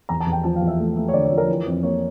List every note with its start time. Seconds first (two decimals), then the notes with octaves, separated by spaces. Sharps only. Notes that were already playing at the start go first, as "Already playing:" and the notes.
0.09 E2 A#5
0.20 A5
0.26 E2
0.32 G5
0.44 F3 A5
0.56 F5
0.61 E2
0.67 E5
0.79 A3
0.96 A3
1.08 C#5
1.14 D3 D5
1.25 C#5
1.32 F3
1.38 A#4
1.48 E3
1.66 F2
1.83 A#3 C#5